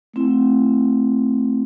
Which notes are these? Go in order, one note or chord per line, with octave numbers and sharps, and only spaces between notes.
A3 C4 E4